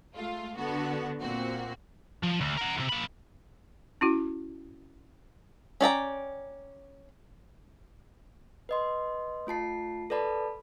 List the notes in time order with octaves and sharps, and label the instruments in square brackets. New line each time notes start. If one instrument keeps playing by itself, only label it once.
[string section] G#3 A3 F4
D3 B3 F#4 A4
A#2 A#3 C4 F#4
[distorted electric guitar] F3
D2
A#4 F#5
D2 C3
A#3 B5
[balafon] C#4 E4 F#4
[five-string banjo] C#4 D5 G5 A#5
[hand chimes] B4 D#5 C6
A3 F4 A5 C7
A4 B4 D5 A5 B5